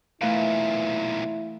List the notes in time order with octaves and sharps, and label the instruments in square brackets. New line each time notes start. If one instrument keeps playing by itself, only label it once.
[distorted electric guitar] B1 A#2 [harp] E3 A3 B4 [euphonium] E4 [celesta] F5